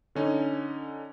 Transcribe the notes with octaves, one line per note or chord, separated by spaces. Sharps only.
D3 C#4 D#4